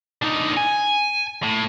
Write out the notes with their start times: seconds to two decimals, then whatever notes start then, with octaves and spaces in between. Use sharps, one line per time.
0.22 D3 D#4
0.57 G#5
1.43 A2